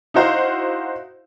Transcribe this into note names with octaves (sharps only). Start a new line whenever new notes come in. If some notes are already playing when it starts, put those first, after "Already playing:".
D#4 E4 F#4 C5 F5